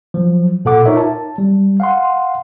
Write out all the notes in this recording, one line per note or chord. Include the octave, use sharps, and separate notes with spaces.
F3 F#3
A#2 A4 F#5 D6
D#4 F4 A#4 C#5 E5
A5
G3
F5 F#5 C6